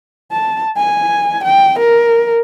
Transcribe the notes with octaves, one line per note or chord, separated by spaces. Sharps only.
A5
G#5
G5
A#4